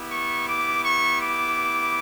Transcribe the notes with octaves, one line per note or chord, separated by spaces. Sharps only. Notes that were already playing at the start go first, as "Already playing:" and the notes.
Already playing: B3 E4 G4
C#6
D6
C#6
D6